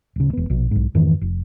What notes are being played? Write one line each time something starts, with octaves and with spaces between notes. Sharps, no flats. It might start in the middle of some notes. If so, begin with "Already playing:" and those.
D1 C#3
E1 B3
A#1 B2
B1 G#2
F2 G#2 D#3 E3
F1